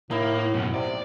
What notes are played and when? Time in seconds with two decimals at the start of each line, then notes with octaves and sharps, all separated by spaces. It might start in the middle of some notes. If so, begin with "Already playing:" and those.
0.11 A2 A#3 D#4 E4
0.54 F#2 B2
0.74 C3 D5